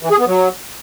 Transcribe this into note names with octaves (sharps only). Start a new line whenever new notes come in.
E3
G#4
B3
F#3